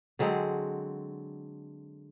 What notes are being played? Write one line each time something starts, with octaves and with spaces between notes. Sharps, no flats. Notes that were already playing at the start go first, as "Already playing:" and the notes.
D3 F#3 G#3 C4